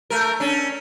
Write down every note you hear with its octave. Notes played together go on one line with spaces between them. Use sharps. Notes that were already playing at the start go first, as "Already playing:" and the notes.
A3 A#4
C#4 D4